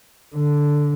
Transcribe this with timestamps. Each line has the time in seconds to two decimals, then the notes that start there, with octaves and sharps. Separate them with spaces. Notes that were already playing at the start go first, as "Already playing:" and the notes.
0.36 D3